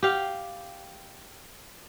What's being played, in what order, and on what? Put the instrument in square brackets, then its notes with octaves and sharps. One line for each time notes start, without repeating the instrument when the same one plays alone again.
[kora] G4 F5